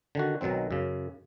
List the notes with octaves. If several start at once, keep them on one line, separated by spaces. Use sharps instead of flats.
D3 D#3 F#4
B1 B2 D#3 F#3 C4
F#2 C#3